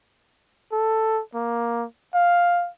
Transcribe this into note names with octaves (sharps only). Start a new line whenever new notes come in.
A4
A#3
F5